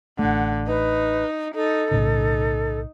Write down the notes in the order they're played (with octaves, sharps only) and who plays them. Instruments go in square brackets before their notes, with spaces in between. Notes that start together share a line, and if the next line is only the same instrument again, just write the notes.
[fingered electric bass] A1 A3 [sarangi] D3 [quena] F#5
[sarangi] D#4 [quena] B4
[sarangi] D#4 [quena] A4
[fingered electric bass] B1 A2 C#3 [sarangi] D#4